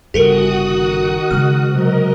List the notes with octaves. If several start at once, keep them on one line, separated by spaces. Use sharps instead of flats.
G1 C#3 F#4 G4 A4 A#4 D#6 F#6
D#3
C#3 G#3 F6
C3 F#3 A#4 D#5